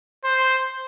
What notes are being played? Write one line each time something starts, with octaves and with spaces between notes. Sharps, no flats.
C5